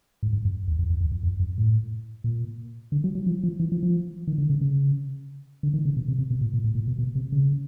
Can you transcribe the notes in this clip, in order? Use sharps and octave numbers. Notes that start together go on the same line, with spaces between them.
G#2
G2
F#2
E2
F2
F2
E2
F2
F2
F#2
A2
A#2
D3
F#3
F#3
F3
F3
E3
F3
F3
D#3
D3
C#3
C#3
D3
D#3
C#3
B2
C3
C3
B2
A#2
A#2
A2
A#2
B2
B2
C3
C#3